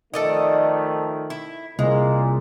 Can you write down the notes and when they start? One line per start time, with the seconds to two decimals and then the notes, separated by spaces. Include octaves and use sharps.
0.14 D#3 F3 A3 A4 D5 D#5
1.30 E4
1.79 C2 A#2 G#3